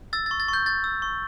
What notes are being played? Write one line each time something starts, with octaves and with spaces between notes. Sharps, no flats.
E6 A6
A6
C#6
A6
C#6
G6
G6 A6
E6
C#6